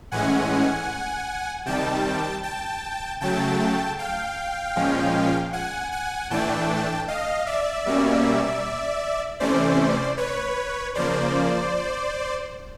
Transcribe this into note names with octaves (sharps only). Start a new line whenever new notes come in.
A2 E3 G#3 C#4 F#5 G#5
C3 D#3 G3 G5 A5
G5 A5
C#3 F#3 A3 G5 A5
F5 G5
A#2 F3 G#3 C#4
F#5 G#5
F#5 G#5
A2 E3 A3 D4 G5 A5
D#5 F5
D5 E5
B2 G3 A#3 C#4
C3 E3 A3 C#4 C5 D5
B4 C#5
C#3 F3 A#3 C5 D5